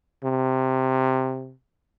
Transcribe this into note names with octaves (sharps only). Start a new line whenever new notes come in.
C3